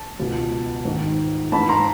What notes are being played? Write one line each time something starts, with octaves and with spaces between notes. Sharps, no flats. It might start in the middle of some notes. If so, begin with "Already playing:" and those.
Already playing: A5
C#2 B2
G#2 D#3
G#2 E3 A5 B5
A#5 C6